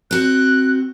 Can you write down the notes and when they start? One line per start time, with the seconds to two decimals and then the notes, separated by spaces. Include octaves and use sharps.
0.11 C4 F#4 F#6